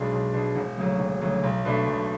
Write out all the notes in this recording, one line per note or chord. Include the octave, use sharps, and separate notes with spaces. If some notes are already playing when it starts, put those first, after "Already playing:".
Already playing: B1 B2 G#3 D4
B1
B2 G#3 D4
E1
D2 C#3 F#3
E1
D2 C#3 F#3
B1
B2 A3 D4
B1